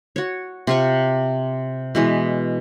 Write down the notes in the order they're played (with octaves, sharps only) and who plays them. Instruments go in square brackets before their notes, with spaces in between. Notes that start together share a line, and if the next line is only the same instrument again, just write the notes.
[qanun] F#4 C#5
C3 F4 C#6
B2 E3 G#3